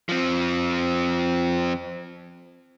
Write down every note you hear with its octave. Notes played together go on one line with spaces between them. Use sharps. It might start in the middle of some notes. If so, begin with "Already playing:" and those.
F3 C4